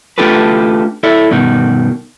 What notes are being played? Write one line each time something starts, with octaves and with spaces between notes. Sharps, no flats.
A3 D4 F4 G4 A4 B4
E4 A4 D5 E5
G2 B2 D#3